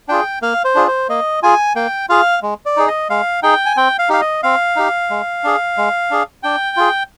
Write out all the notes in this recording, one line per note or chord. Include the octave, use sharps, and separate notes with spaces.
D4 F4 G#4 G5
A#3 F5
C5
D4 F4 G#4
C5
A#3 D#5
F4 G#4 G#5
A#3 G5
F4 G#4 F5
G#3
D5
D#4 G#4
D#5
G#3 F5
D#4 G#4 G5
G#5
C4 G5
F5
D#4 G4 F5
D#5
C4 F5
D#4 G4
G#3
D4 G#4
G#3
D4 G#4
D4 G5
F4 G#4